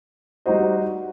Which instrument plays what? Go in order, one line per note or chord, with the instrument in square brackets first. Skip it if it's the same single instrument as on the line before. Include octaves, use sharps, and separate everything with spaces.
[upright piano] G3 D#4 F#4 C5 D#5